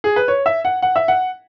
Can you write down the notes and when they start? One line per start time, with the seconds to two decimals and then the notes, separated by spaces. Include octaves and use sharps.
0.04 G#4
0.16 B4
0.28 C#5
0.46 E5
0.65 F#5
0.82 F#5
0.96 E5
1.08 F#5